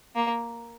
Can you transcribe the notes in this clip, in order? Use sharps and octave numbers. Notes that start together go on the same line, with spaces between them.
A#3